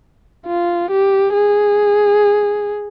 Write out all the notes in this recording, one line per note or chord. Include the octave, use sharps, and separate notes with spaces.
F4
G4
G#4